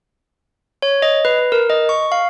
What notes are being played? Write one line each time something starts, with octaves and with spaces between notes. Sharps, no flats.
C#5
D#5
B4
A#4
D#5
C#6
F5